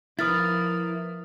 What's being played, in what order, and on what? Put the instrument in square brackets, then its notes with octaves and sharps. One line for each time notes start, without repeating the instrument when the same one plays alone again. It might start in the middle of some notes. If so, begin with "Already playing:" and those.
[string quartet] F3 A#3 [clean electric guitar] E4 A#4 B4 [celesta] D#6 F6 A6